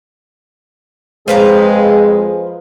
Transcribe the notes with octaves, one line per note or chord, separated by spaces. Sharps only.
F2 F3 G#3 G#4 B4 A#5